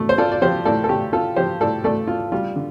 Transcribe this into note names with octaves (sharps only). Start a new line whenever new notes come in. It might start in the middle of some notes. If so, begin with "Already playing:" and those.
Already playing: A3
C5
F4 A4 D5
D5
F3 G4 C5
A2 A4 D5
A4
A3 G4
F4 A4
F3 G4 C5
A2 A4 D5
A3 A4 D5
F4
G3 F4
D3